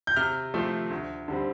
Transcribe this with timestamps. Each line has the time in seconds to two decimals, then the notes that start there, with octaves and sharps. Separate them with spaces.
0.07 G6
0.16 C3 F6
0.54 F3 A3 C4
0.90 D2
1.28 D3 G3 C4